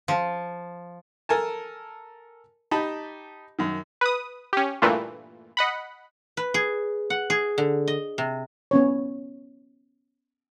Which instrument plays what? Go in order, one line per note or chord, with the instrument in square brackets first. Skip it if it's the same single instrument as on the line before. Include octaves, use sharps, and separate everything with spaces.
[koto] F3
[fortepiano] A4 A#4 G#5 A5
D#4 G4 A5 B5
F#2 D#3
[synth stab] B4 D#6
C#4 G4
G2 A#2 E3 A3 A#3 F4
D#5 F#5 B5
[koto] B4
G#4
F#5
G#4
D3
D#5
C3
[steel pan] B3 C#4 C#5